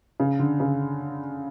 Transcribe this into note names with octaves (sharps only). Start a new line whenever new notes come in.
C#3
D3
C#3